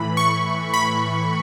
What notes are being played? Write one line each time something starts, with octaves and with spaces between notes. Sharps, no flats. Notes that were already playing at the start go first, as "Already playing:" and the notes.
Already playing: A2 E3 B5
C#6
B5